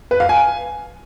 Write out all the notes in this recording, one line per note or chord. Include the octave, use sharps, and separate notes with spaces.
B4
F5
G#5